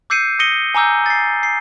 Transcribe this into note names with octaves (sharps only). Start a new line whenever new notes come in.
D6 E6 G6 C7 C#7 D#7
D#6 A#6 C#7 D#7 G7
G#5 A#5 D6 E6 G6
A6 C7
C7